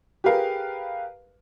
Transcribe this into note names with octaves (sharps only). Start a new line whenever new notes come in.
G4 G#4 A#4 B4 F5